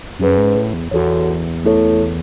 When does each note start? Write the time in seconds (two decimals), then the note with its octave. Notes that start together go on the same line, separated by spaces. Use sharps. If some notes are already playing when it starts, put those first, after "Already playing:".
0.19 F#2 C#4 G#4 B4
0.38 G#2
0.56 A2
0.73 E2
0.91 E2 F#4 A4 C#5
1.64 A3 E4 A4 C#5